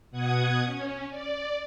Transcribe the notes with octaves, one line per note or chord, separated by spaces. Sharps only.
B2 F#5 D#6 G#6
C#4
D5